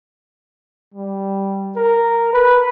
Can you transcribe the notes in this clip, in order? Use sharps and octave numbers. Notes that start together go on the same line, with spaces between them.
G3
A#4
B4